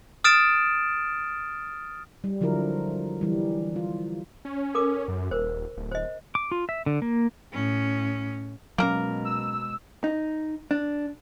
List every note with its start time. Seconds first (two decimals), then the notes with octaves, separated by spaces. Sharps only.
0.24 D#6 F6 A6 D7 E7
2.24 G3
2.41 D3 F3 F#3 E4 A#4
3.21 E3 G3
3.76 F4
4.45 C#4
4.75 C#4 A4 A#4 D6
5.08 F#2
5.31 D#1 A#4 C5
5.77 D1
5.92 C5 D#5
6.35 D6
6.52 F4
6.69 E5
6.86 D3
7.02 A#3
7.53 A2 C#4
8.78 B2 F#3 G#3 A#3 C#4 A#4
9.24 E6
10.04 D#4
10.71 D4